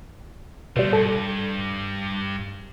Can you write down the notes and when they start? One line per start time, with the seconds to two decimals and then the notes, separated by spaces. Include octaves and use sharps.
0.76 B2 G3 A3 F4
0.93 G2 A4